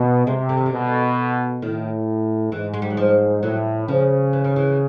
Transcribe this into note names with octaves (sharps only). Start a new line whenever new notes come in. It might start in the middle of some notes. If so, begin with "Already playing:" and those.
Already playing: B2
C3 G#3
D3
D#3
D3
B2
A2 D#3
G#2 E3
G#3
G3
F#3
F3
A2 F#3
C#3 F3
E3
D#3
E3